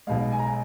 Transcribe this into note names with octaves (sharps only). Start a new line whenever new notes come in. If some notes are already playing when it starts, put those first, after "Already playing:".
B1 B2 G#3 F5
G#5
A#5
G#5